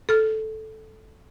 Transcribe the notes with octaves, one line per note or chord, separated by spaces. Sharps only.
A4 F6